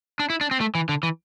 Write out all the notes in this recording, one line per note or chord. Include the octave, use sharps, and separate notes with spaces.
D4
E4
D4
C4
A3
E3
D3
E3